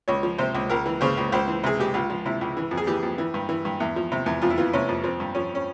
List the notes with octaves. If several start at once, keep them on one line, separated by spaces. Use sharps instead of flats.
C#2 C#5
F3
C3 C5
C#2
C#2 A#4
E3
C#3 C5
C#2
C#2 C5
E3
C3 G#4
C#2 G4
C#2 F4
F3
C3 E4
C#2
E3
F2
G#4
E3 G4
F2
E3
G2
E3
G2
E2
F3
C3
E2
F2 F4
E4
E3 F4
C3 C#4
F2
F3 C4
G2
F3 C#4
C#4